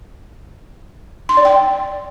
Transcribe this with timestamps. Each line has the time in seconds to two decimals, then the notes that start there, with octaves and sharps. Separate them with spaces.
1.29 C6
1.37 D5
1.45 G5